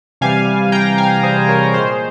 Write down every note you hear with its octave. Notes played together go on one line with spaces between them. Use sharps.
C3 E3 G3 F5 G#5
G5 A#5
F5 G#5
G#4 C5
A#4 C#5
A#2 G#3 G#4 C5